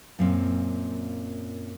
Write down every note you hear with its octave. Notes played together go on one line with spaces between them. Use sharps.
F#2 A#2 C4